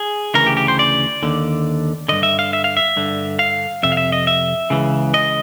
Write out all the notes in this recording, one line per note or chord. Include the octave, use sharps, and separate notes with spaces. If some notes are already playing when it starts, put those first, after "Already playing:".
Already playing: G#4
D2 C#3 E3 A#4
G4
G4
C5
D5
D#2 D3
G2 D3 D#5
E5
F5
E5
F5
E5
G2 D3
F5
F2 C3 E5
F5
E5
D#5
E5
C#2 C#3 E3
D#5